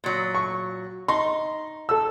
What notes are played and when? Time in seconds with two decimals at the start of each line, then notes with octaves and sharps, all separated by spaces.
0.04 A#2 F#3
0.35 C#6
1.08 D#4 C6
1.89 A4 E6